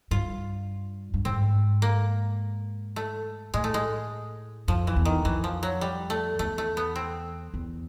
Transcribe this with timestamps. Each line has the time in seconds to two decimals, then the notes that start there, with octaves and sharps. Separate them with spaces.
0.11 G2 F4
1.14 G2
1.25 G#2 C4
1.82 A#3
2.96 A3
3.54 A2 G#3
3.64 A3
3.74 G#3
4.68 F2 F3
4.87 E3
4.96 E2
5.05 D#3
5.25 F2 E3
5.44 F3
5.63 F#3
5.81 G3
6.10 A3
6.39 E2 A3
6.58 A3
6.77 B3
6.96 C4
7.54 E2